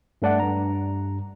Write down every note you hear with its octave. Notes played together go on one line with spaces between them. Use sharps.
G2 A3 D4 D5 F#5
G2 A#5